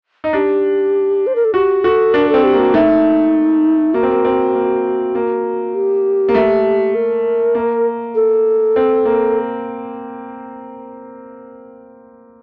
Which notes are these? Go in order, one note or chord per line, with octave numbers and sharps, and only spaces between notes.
D#4
D4 G4
C5
A#4
A4
F#4 G4
F#4 A4
D4 A#4
C4 A4
G4
A#3
F#4
A3 D#4
A#3 F#4
C4
A#3
C4
A#3
A#3
G4
A#3
A3
A#4
A#3
A4
C4
A#3